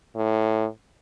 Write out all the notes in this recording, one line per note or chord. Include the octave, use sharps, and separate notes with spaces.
A2